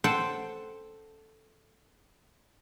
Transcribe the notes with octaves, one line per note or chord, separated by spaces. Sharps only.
A4 C5 F#5 G5 A5